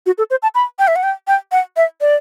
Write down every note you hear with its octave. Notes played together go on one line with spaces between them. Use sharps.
F#4
A4
C5
A5
B5
G5
E5
F#5
G5
G5
F#5
E5
D5